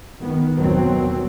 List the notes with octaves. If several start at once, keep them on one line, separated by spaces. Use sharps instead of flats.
D#3 B3
D#2 B2 F#3 C4